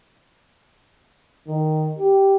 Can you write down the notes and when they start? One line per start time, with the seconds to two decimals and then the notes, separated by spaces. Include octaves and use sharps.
1.47 D#3
1.99 G4